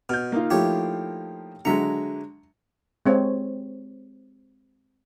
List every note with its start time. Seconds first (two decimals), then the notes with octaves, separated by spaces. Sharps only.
0.09 B2 F6 G6
0.32 A#3 D#4 F4
0.50 F3 A3 E4 G4 C#5
1.65 D3 F#3 G#3 E5 A#5 C#7
3.06 G#3 C4 C#5